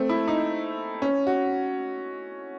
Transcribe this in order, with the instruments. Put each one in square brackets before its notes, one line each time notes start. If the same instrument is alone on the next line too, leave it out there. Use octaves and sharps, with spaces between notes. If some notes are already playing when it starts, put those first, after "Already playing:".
Already playing: [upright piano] A3 C4
E4
D#4
C#4
F#4